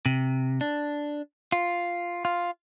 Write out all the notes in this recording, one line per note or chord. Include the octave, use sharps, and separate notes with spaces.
C3
D4
F4
F4